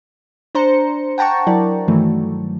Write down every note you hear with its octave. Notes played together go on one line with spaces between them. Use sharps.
D4 C5 A#5 C#7
F#5 G5 A5 A#5 C#6
F#3 E4 A#4 D5
G2 D#3 E3 F#3 A3